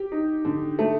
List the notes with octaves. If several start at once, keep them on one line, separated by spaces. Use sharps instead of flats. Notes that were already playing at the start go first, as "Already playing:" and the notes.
Already playing: G4
D#4
D3
A3